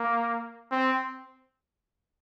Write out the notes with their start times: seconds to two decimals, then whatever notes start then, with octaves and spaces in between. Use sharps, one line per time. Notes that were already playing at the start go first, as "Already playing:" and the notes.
Already playing: A#3
0.72 C4